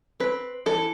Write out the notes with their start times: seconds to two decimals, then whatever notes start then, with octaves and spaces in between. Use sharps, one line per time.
0.20 C4 B4
0.66 E3 A4